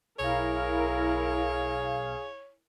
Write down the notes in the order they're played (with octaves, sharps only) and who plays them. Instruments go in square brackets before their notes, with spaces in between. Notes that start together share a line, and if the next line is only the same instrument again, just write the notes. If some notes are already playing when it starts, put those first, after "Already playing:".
[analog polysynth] B1 F5 [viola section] E4 A#4 [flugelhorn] G#4 [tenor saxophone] C#5